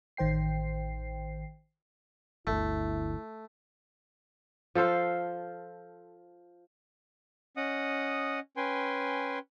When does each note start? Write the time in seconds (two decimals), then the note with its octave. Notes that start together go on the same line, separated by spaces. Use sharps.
0.17 A1 D#3 C5 G5 C7
2.47 G1 D2 A3 E4
4.75 F3 A4 C5 F5
7.57 C#4 D#5 F#5 D#6
8.57 C#4 B4 G5 G#5 C6